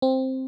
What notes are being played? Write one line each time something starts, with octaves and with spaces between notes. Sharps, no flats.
C4